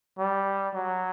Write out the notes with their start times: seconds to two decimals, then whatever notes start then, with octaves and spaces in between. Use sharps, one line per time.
0.19 G3
0.74 F#3